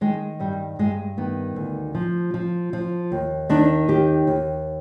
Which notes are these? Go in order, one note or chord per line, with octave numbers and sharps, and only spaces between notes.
D#3 G#3
G2 G3
G2 G#3
D#3 B3
D2
F3
F3
F3
D#2
D#3 D4
D#2 G4
D#2